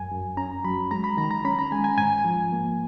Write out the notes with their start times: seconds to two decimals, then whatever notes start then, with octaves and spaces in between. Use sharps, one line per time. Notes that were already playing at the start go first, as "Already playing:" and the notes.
Already playing: F#2 G#5
0.11 F#2
0.37 C#4 A#5
0.64 F#3 B5
0.91 G#3 A#5
1.04 B5
1.17 D#3 A#5
1.31 A#5
1.45 C#4 B5
1.59 A#5
1.72 G#3 G#5
1.84 G#5
1.98 G#2 G#5
2.24 F3
2.52 A#3